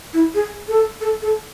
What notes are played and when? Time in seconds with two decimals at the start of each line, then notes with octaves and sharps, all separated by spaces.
0.13 E4
0.34 G#4
0.68 A4
1.01 A4
1.22 A4